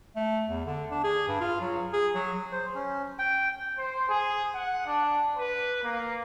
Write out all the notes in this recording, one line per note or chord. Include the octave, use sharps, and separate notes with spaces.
A3
E2
D3
D4
G#4
G2
F4
F#3
G#4
F#3
C5
C#4
G5
C5
G#4
F#5
D4
B4
A#3